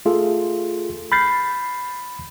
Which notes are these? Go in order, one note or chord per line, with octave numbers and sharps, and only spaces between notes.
A3 F4 G#4 A4
B5 F6 G6 A6 C7